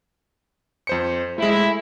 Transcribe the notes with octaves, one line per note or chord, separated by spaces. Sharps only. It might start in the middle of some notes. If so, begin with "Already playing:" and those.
F2 C5 C#7
G#3 A3 E4